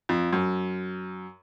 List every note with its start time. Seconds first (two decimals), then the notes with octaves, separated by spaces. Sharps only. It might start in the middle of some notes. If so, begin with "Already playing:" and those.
0.09 F2
0.33 F#2